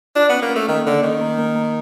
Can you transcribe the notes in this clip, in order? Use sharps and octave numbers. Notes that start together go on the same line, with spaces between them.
D4 F4
B3
C#4
A#3
C#4
A3
D#3 A#3
D3 A#3
D#3 C#4
A#3
A#3
A#3